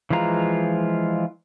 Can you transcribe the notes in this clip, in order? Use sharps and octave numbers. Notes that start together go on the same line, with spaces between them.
E3 F3 G#3 F4 A#5